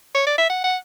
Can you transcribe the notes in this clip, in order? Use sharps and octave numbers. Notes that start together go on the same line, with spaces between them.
C#5
D5
E5
F#5
F#5